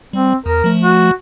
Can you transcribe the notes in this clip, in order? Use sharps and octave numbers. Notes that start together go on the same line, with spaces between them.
G3 C4
E2 A#4
F3 A3
F#4